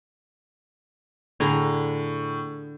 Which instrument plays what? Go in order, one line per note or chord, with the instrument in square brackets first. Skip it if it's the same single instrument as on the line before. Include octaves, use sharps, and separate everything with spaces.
[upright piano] A2 [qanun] D3 G#4 A#5